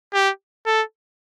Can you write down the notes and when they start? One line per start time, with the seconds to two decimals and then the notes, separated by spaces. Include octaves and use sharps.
0.14 G4
0.66 A4